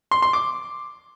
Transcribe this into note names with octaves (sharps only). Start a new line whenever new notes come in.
C6
C6
D6